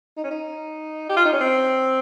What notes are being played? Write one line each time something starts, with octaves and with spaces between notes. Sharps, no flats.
D#4
C#4
D#4
G4
F4
D#4
C#4
C4